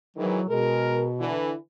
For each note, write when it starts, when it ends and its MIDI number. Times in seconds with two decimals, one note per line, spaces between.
0.17 0.40 44
0.17 0.40 51
0.17 0.40 52
0.17 0.45 54
0.49 1.35 47
0.49 1.07 56
0.49 1.07 70
1.19 1.54 50
1.19 1.54 52